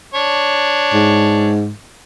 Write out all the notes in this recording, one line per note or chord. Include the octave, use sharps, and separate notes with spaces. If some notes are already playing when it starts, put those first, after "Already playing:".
D4 C#5
G#2